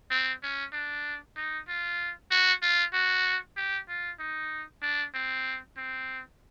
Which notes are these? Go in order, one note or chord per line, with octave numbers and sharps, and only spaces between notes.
C4
C#4
D4
D#4
F4
F#4
F4
F#4
G4
F4
D#4
D4
C4
C4